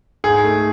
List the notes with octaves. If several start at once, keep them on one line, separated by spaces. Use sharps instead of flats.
G#2 G#4
A3